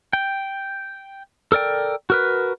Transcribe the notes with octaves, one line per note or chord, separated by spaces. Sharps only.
G5
A4 A#4 D5 G5
F#4 A#4 B4